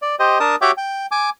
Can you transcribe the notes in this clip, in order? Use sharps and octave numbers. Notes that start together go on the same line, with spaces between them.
D5
G4 C5 D#5
D4 A#4 A5 D#6
F#4 G4 C#5 E5 G5 D6
G5
G#5 D6